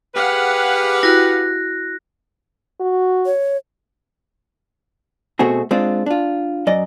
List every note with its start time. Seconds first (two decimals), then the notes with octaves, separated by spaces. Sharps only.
0.15 G4 G#4 B4 F5 F#5
1.03 E4 F#4 F#6 A#6
2.80 F#4
3.26 C#5
5.39 B2 A3 C4 F#4 G#4
5.71 G#3 C4 D4 F4
6.06 D4 F4
6.67 F#2 D5 D#5